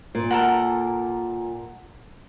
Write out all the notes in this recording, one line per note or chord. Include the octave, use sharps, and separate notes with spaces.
A#2
A4 A#4 F#5